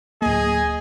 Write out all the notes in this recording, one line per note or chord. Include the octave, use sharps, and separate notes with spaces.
D1 A#3 G#4 D#5